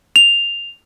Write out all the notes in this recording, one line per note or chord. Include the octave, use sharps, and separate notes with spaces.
F7